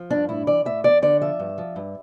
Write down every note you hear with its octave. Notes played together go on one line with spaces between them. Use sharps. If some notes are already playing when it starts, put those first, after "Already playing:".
Already playing: F3
G2 D4
A2 E4
E3 D5
A2 E5
E2 D5
D3 D5
F3 E5
G2
F3
G2